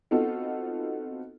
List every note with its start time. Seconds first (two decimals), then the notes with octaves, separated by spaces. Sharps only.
0.11 B3 C4 D#4 F4 F#4 A4